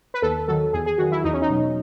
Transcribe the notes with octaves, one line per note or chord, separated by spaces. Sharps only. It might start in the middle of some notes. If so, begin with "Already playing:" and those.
B4
D#2 A4
D#3 F#3 A4
E2 G#4
G#4
D#3 F#3 F#4
E4
E2 D#4
C#4
D#4
B2 F#3